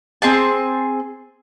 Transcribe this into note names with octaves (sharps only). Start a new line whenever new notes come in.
C4 G#4 A5